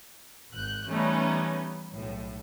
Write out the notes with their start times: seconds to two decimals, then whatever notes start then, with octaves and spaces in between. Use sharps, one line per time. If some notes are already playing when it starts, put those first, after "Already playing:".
0.52 G#1 F#6 G6
0.87 E3 G3 A3 B3 C#4 D#4
1.94 B1 A2